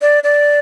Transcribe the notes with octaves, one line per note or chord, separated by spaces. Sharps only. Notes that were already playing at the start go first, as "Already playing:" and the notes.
D5
D5